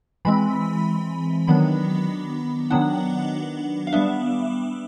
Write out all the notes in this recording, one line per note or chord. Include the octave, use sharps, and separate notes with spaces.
E3 G#3 C4 B5
D#3 F#3 B3 D4 B5
D#3 F#3 B3 D4 F#5
F5
G3 B3 D4 E5